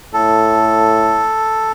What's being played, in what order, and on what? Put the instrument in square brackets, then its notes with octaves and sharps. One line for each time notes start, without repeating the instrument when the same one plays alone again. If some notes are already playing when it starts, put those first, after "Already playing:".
[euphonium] A2 [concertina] A4